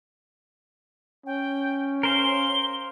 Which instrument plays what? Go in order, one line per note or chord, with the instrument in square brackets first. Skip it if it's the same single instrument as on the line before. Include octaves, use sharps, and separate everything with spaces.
[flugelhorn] C#4 [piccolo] G5
[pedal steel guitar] A#4 C5 F5 [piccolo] G7